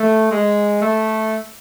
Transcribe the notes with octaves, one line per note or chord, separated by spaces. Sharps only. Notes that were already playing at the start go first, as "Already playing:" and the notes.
Already playing: A3
G#3
A3